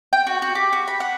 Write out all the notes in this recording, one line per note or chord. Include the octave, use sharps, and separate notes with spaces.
G5
F#4
F#4
G4
F#4
B5
F#5